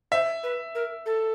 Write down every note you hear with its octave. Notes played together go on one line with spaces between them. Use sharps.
C5 E5
B4
A#4
A4